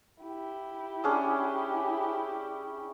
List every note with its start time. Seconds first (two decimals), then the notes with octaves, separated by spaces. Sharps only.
0.23 E4 G4
1.04 C#4 D4 G#4